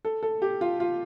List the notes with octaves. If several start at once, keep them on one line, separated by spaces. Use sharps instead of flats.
A4
A4
G4
F4
F4